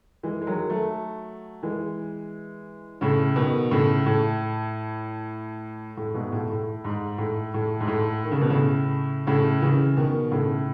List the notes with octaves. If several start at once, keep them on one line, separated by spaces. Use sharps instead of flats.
E3 G#3
G#3
D#3 F#3
F#3 A3
E3 G#3
A2 C#3
B2 D#3
A2 C#3
A2
A2
G#2 B2
A2
A2
G#2
A2
A2
G#2
A2
D#3
C#3
B2
A2 C#3
A2 C#3
C#3 E3
B2 D#3
A2 C#3